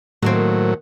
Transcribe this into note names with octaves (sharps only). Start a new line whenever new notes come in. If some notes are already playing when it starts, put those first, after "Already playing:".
A2 D#3 F#3 A#3 C4